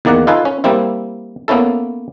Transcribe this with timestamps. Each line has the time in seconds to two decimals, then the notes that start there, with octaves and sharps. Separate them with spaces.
0.05 E2 D#3 A#3 D5 F#5
0.27 D#4 F4 A4 B4 F5 G#5
0.45 C#4
0.64 G3 A#3 C4 E4
1.48 A#3 B3 C#4 E4 A4